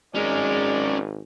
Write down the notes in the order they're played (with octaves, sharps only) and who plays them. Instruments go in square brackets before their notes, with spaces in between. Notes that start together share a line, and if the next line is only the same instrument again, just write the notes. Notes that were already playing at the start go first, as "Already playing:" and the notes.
[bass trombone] G#1 [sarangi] G#3 [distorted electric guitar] C#4 A#4 [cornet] D5